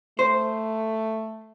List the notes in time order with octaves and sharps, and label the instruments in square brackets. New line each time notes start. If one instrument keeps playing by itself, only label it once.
[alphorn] A3 [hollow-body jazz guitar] C5